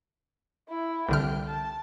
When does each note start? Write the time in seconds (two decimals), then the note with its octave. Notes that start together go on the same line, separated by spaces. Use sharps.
0.69 E4
1.09 C2 D3 G5 F6
1.48 A5